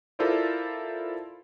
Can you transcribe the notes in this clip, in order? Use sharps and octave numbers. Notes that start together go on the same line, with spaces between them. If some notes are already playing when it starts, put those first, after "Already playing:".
E4 F4 A4 A#4 C5 D5